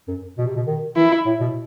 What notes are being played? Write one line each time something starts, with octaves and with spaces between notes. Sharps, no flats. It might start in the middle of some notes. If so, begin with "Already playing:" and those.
F#2
B2
C3
B2
D#3
E3 E4
A2
B2